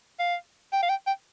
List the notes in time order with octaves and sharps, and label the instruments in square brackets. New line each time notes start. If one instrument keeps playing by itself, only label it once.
[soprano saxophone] F5
G5
F5
G5
G5